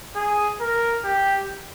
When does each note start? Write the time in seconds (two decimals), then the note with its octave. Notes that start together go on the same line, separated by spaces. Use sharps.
0.16 G#4
0.61 A#4
1.04 G4